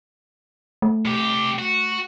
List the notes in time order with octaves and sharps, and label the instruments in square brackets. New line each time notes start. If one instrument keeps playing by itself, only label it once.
[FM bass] A3
[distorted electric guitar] C2 G4
F#4